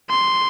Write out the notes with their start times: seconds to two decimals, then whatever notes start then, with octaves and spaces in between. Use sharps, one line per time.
0.10 C6